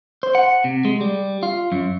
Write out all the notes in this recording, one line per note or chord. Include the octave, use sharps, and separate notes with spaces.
C5
F#5
C3
G#3
G3
F4
F#2